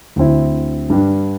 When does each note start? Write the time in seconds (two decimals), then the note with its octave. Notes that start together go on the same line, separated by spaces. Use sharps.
0.16 D2 D3 C4 E4
0.90 G2 G3 D4